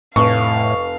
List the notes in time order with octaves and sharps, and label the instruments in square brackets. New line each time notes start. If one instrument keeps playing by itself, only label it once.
[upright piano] F1 [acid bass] A2 [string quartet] F5 [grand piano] C#6